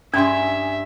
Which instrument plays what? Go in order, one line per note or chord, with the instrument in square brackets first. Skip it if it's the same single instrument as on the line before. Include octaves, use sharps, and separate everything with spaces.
[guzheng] G2 G4 G#4 [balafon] C#4 G5 C6 [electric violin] E5